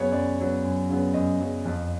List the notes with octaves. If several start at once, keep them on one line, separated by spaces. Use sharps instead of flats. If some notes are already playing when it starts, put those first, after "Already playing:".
Already playing: F#2 C#3 F#3 B3 C#5
F#2 D5
C#3 F#3 B3
F#2
C#3 F#3 B3
F#2 D#5
C#3 F#3 B3
F2